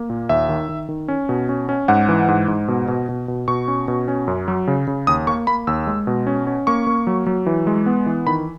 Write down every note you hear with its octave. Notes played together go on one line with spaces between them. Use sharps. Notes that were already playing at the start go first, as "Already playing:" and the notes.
Already playing: A#3
A#2
D#2 E5
D#3
D#3
D#3
C#4
B2
C#4
C#4
G#2 F#5
E3
G#2
G#2
B2
B2
B2
B2
B2 C#6
C#4
B2
C#4
F#2
F#3
C#3
C#3
D#2 D#6
A#3 C#6
A#3 B5
D#2 E6
G#3
B2
C#4
C#4
A#3 C#6
A#3
F#3
F#3
E3
G#3
B3
E3
D#3 B5